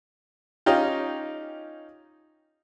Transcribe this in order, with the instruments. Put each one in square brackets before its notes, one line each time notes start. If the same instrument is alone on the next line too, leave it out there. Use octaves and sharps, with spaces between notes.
[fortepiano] C#4 D#4 F4 G4